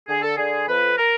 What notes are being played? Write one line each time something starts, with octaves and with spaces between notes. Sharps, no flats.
D3 G#4
A4
D3 G#4
F2 B4
A#4